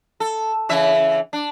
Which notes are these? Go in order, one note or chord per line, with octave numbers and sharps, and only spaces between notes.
A4
C#3 E3 E5
D4